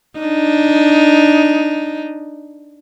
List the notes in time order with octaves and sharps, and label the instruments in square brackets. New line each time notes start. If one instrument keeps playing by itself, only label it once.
[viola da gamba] D4 D#4